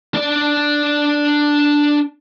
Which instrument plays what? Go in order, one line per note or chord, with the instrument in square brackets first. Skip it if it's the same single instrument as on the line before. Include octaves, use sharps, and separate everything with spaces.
[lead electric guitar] D4 D5